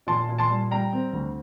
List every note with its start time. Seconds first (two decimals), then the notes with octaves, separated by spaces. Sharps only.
0.07 A#2 A5 C6
0.29 A#2
0.38 A5 C6
0.50 G3
0.71 G3 G5 A#5
0.93 C4
1.13 D2